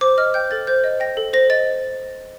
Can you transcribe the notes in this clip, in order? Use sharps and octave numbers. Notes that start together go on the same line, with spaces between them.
C5 D6
D#5 F6
G5 G6
A4 A6
C5 G6
D#5
G5 A#6
A4
C5 A#6
D#5 A6